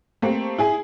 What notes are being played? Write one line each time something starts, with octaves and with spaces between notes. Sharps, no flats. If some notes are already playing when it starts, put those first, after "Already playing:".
A3 A#3 C4 G4
E4 G#4 G#5